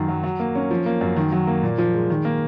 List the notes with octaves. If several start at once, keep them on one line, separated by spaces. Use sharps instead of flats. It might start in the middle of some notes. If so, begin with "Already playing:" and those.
Already playing: F#2 D#3
F#3
F#3
A#3
C#4
F3
A#3
F#2
D#3
F#3
A#3
A#2
F3
G#3
D#3
A#3